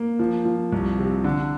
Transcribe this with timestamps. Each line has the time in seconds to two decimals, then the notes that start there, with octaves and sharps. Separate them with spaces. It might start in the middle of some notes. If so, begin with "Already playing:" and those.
Already playing: A#3
0.19 F3
0.45 F3
0.72 C2
0.99 C3
1.24 D3